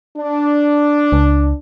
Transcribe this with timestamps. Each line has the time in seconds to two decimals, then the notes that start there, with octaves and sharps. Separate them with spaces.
0.17 D4
1.12 C#2